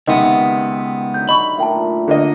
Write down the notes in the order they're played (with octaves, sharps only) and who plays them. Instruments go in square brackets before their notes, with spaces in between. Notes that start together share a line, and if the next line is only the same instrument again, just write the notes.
[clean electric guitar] C#2 B3 [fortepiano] C3 D#3 [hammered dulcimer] B4 [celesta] D#5 F#5
[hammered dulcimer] D3 F#3 F5 [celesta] G6
[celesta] D#5 C#6 [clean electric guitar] B5
[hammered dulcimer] A#2 A3 A#4 [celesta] E5 G5 A5
[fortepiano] D3 A#3 D#5